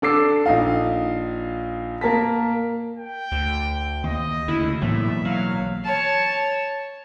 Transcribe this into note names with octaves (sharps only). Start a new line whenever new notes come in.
D4 A4 D6 E6 C7
A#1 D#4 F5
A#3 A#4 A5 B6
G5
D2
D#2 D#5
D2 C#3 E4
B1 A2 E3 A#3 E5
F#3 F5
C#5 A5